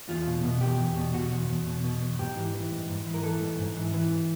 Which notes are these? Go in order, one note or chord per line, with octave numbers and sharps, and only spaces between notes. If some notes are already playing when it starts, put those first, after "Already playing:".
E2 F4
B2
B2
E2 G4
E2
B2
B2 F#4
E2
E2
B2
B2
E2
G#2 G4
E3
E3
G#2
G#2
E3
A#4
E3 A4
G#2
G#2
E3
E3